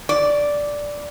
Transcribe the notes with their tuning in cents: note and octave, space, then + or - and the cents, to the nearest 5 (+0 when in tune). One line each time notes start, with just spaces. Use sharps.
D5 -5